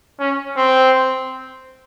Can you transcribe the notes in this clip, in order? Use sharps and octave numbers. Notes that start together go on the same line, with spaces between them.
C#4
C4